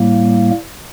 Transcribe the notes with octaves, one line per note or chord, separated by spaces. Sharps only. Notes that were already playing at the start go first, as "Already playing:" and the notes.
Already playing: A2 G3 A#3